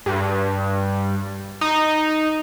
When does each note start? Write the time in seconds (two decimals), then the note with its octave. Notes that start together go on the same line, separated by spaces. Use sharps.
0.06 G2
1.61 D#4